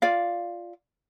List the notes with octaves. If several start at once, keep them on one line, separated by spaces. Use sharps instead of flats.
F4 D5 F5